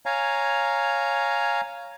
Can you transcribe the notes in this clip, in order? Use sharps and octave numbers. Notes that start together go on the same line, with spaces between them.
C#5 F5 G#5 A#5